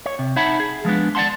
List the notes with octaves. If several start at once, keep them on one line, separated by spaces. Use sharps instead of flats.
C#5
C3
D#4 C#5 E5 F#5 A5 B5
G#4
F3 G#3 B3 D4
D5 E5 F#5 A5 C6